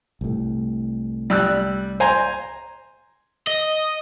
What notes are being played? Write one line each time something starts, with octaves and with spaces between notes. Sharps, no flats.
C2 A2
G3 E6 F#6
C5 G#5 A#5
D#5